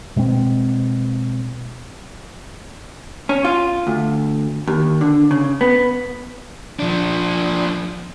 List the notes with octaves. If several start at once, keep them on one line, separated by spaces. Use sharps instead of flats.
B2 G#3 A#3 C4
C#4
F4
D2
D#2
D3
C#3
B3
F3 D4